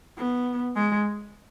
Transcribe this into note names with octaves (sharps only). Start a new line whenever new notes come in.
B3
G#3